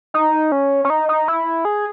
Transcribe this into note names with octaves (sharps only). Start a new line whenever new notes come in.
D#4
C#4
C#4
D#4
D#4
E4
G#4